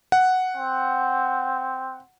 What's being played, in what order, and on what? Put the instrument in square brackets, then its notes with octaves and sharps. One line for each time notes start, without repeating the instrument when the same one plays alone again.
[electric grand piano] F#5
[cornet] C4